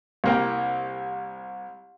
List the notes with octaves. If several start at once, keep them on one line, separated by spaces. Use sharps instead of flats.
C2 A#3 G5